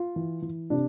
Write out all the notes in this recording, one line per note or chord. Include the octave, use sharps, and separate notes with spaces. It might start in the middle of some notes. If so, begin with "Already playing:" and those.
Already playing: F4
E3
E3
C3 D4